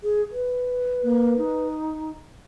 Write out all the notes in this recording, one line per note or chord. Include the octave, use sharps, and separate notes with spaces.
G#4
B4
A#3
D#4